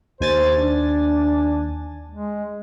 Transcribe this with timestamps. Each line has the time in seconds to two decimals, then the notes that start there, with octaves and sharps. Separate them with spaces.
0.20 D#2 C5 G#5 A6
0.56 D4
2.11 G#3